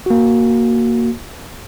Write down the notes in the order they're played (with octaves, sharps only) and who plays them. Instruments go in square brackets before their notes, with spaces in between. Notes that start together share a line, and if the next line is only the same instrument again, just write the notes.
[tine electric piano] A#3 F#4